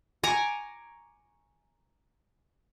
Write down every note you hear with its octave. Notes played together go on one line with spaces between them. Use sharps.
G#5 A#5 C#6 D6